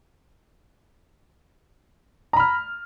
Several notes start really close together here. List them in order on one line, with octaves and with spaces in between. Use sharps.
A#5 B5 F6